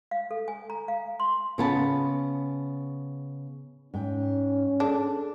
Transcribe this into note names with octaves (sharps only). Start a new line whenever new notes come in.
F5
A4
G#5
A#5
F5
C6
C#3 B3 A5
G#2 C#4 G5
D4 G#4 A4